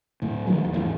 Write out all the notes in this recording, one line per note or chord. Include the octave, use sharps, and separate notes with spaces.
D2 A2
D3 D#3 F3 F#3
D#1 E2
G#1 E2 A2 E3